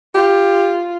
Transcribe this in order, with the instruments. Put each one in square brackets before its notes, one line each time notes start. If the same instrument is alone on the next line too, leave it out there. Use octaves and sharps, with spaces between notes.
[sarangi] F4 [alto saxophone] G4